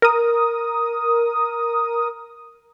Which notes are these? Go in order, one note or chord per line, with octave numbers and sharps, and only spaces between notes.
A#4 D#6